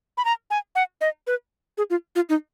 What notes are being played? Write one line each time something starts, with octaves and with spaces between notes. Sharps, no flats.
B5
A#5
G#5
F#5
D#5
B4
G#4
F4
F4
D#4